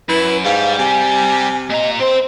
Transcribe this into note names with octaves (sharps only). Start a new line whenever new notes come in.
F#2 E4 B4
G#2 G3 F5
C3 G#5
A#2 D#5 A#5
C4 C5 C6